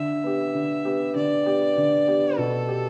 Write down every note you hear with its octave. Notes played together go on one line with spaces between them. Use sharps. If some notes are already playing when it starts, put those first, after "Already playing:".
Already playing: D3 E5
B3 G4
D3
B3 G4
D3 D5
B3 G4
D3
B3 G4
B2 A4
B3 G4